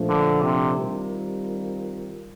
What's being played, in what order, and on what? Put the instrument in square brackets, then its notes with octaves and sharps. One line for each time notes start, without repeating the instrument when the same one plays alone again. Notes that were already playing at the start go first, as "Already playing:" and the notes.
Already playing: [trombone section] A#2 F3 A3 D4
[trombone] D3
C3
[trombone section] D#3 G3 C4 F4 A#4